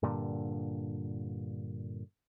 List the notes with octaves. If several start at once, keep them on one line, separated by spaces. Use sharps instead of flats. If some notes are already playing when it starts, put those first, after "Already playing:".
G2 A#2 D3